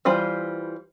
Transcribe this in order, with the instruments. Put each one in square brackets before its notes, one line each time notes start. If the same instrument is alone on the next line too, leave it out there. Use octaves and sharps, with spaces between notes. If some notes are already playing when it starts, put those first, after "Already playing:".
[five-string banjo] E3 G3 F4 C5 B5